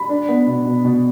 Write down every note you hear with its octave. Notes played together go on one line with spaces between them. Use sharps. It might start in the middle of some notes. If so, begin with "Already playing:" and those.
Already playing: B5
D4
B3
B2
B2
B2